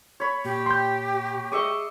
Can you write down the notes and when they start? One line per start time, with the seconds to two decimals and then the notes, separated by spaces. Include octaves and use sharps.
0.20 C#5 B5
0.45 A#2 G4
0.66 C6 G6
1.52 G#4 D#5 E5 C#6 D6